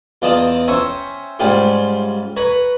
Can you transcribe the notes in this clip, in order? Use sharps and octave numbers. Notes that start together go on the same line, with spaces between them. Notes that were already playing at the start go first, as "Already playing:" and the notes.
E2 F4 D5 D#5 A5 A#5
C#4 C5 C#5 E5 G5 A#5
G#2 G3 C#4 F4 G4 C6
B4 C#5 A#5